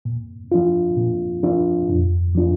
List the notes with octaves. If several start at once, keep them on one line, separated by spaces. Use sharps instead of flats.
A#2
F3 D4 F4
A#2
F3 D4 F4
F2
F3 D4 F4